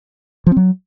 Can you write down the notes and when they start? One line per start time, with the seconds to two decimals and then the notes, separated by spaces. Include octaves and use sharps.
0.47 F3
0.52 C4
0.57 F#3